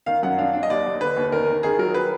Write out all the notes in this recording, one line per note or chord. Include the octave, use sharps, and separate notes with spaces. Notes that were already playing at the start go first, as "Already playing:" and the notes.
D#3 F5
F#2 F#5
D4 F5
D4
D#5
D#2 D5
D#2
D3 B4
D#2
D#3 A#4
D#3
D#3 G#4
F#3 A#4
B4